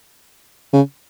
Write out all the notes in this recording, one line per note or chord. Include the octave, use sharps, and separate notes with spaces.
C#3